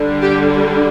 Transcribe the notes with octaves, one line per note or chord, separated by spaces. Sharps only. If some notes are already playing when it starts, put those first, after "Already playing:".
Already playing: D3 G3 D4
G4